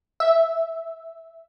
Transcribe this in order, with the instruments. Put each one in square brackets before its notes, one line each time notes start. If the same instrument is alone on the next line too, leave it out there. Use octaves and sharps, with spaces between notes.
[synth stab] E5